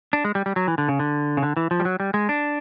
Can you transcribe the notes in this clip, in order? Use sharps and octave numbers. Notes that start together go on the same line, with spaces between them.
D4
G#3
G3
G3
F#3
E3
D3
C#3
D3
C#3
D3
E3
F3
G3
F#3
G3
G#3
D4